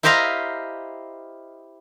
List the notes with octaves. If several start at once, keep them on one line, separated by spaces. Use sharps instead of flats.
E4 G4 C5 D#5 F5 A#5